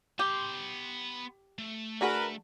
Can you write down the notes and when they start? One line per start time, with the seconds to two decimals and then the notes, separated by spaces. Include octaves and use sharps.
0.19 B3 G4 C6
1.58 A3
2.01 D3 F#4 G#4 A#4 B4